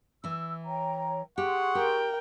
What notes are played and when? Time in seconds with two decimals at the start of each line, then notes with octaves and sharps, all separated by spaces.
0.24 E3 E4 E6
0.64 C#5 G5 A#5
1.38 G4 G#4 F#5 C6 C#6
1.75 G4 A#4 G5